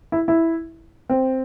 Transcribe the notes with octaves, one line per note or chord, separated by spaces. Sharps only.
E4
E4
C4